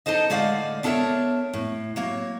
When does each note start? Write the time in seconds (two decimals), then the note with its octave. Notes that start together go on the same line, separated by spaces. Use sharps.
0.06 D4 D#4 A4 C5 D#5
0.30 A2 D3 G#3 D5 F5 F#5
0.83 B3 D4 A4 A#4 C#5 E5
1.53 A2
1.96 F#3 A#3 C#5